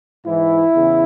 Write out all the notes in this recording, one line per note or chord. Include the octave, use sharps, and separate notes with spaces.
G#2 E3 E4
E2 C#3